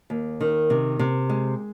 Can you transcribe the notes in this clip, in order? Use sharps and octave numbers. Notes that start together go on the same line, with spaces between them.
D#2
D#3
C3
C3
G#3